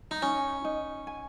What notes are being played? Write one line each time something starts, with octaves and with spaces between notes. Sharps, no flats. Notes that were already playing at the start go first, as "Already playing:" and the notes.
D#4
C#4 D#4
D#4
G#5